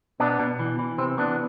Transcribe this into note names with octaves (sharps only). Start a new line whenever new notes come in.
B2 B3 D4
B2
E3
E3
C3 C4
E3 B3 D4